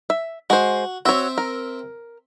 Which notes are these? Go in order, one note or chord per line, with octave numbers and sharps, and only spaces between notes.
E5
G#3 F#4 C5
C4 F#4 C#5 E5
A#4